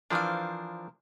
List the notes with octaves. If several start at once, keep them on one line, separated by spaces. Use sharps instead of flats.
E3 F3 D4 A#4 C5 F5